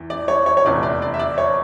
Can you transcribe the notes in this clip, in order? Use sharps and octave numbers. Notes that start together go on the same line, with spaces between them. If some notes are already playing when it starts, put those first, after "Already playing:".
Already playing: E2 E3
D5
C#5
C#5
C#5
F1 E2 D3 D5
D5
D5
E5
D5
C#5